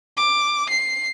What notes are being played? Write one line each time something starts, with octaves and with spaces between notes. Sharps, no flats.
D6
C7